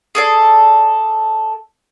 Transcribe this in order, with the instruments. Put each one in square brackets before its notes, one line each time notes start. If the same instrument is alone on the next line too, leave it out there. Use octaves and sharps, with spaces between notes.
[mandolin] G#4 A4 D5